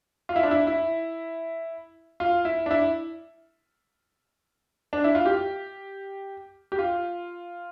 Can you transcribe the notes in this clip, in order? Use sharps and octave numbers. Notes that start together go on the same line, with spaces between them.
F4
E4
D4
E4
E4
F4
E4
D4
E4
D4
E4
F4
G4
G4
F4